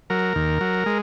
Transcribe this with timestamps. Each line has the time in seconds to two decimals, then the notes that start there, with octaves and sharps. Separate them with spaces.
0.10 F#3 A#4
0.36 D#2
0.61 F#3
0.86 G#3